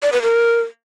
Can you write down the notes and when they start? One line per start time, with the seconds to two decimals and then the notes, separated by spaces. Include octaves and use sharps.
0.03 D5
0.13 B4
0.22 A#4